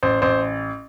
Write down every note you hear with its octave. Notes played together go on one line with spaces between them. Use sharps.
A1 C5
A1 C5